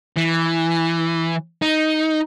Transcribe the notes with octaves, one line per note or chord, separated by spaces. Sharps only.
E3
D#4